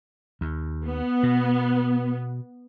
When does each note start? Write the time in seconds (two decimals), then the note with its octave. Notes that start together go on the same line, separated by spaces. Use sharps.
0.41 D#2
0.86 B3
1.23 B2